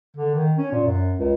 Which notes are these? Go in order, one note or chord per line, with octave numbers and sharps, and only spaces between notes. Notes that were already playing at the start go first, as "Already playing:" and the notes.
D3
D#3
C#4
A#2
F#2
C#2